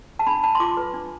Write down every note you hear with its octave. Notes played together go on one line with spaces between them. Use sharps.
A5
D4 B5
D4 A5
C6
F4 D6
B4
D4